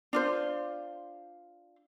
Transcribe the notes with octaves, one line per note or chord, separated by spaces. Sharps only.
D4 F4 C5